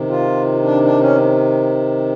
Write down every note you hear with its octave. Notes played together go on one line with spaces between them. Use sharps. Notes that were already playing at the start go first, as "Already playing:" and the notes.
Already playing: C3 D#3
F4
D4
D4
C#4